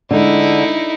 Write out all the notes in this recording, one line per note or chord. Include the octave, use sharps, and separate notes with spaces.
D3 G#3 D#4 E4